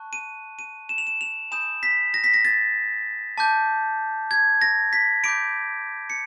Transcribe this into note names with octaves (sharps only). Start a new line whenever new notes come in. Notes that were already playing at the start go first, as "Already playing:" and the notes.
Already playing: A5 C#6 F#6
D#7
D#7
E7
F7
E7
F7
G#5 B5 D#6 G6 E7
B6
A#6
B6
A#6
A6
A5 D6 G6
G#6
A#6
B6
B5 D6 G6 D7
C#7